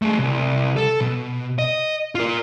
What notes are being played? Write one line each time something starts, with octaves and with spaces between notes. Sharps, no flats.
A3 G#4
C2
A4
B2
D#5
F4 A#4